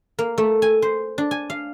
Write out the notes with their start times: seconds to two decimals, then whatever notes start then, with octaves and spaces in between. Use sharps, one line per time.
0.19 A#3
0.38 A3
0.62 G#5
0.82 C5
1.18 D4
1.31 G#5
1.50 F5